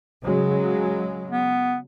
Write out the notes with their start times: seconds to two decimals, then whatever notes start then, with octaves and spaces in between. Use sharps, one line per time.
0.22 C#3 F#3 G#3
1.30 B3